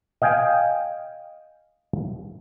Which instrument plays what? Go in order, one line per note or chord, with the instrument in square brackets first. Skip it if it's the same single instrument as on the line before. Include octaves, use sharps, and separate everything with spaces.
[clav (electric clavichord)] D#5 F5 G5 G#5